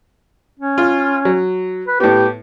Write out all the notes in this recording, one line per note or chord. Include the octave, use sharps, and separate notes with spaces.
C#4
F4
F#3
B4
A2 B3 G4